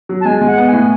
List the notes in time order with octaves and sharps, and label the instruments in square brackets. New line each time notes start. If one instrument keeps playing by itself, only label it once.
[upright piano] F#3
[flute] A5
[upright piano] G#3 [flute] G#5
[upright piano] G#3
[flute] F#5
[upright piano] B3
[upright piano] A2 [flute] G#5